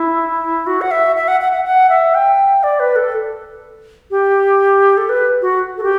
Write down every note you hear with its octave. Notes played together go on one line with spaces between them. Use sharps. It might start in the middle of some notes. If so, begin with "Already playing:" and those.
Already playing: E4
F#4
F#5
E5
E5
F#5
F#5
F#5
F#5
E5
G5
D5
B4
A4
G4
A4
B4
F#4
A4
G4